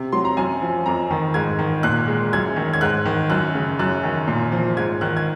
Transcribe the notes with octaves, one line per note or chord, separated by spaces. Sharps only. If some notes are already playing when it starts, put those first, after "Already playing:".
Already playing: C3
F#3 C6
A#5
F#2 G#5
F3
F2 A#5
D#3
G#2 G#6
D#3
A#2 F#6
G#3
F#2 G#6
D#3
G#6
G#2 F#6
D#3
F#2 F#6
C#3
F#2 F#6
D#3
A#2
F3
G#2 G#6
D#3 F#6
G#6